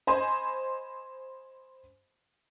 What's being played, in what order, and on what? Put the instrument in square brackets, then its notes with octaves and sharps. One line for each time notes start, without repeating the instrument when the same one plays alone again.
[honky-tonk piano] C5 D#5 G#5 B5 C6